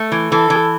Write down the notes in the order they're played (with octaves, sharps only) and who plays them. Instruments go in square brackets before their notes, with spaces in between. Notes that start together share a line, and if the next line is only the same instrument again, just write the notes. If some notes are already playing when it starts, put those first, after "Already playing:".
Already playing: [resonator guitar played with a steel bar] A3
E3
[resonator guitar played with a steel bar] E3 [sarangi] A4
[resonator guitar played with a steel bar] E3